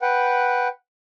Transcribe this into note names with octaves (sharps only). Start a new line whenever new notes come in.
B4 F#5 G5